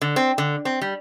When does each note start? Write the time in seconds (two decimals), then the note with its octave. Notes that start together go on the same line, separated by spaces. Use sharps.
0.02 D3
0.16 C4
0.38 D3
0.65 C4
0.82 G3